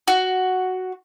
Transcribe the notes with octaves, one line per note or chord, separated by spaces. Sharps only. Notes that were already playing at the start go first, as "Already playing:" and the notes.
F#4